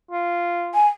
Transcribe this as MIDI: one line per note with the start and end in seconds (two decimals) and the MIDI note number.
0.11 0.76 65
0.74 0.87 80